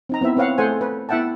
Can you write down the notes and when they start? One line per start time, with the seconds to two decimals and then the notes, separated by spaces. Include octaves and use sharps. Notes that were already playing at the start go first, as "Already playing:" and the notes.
0.09 C4 D#4 A#5
0.21 B3 C4 E4 E5
0.37 C4 B4 C#5 F5 F#5
0.58 A3 G#4 A4 C5 F#5 G#5
0.81 B4
1.09 B3 E4 E5 F#5 G5 A5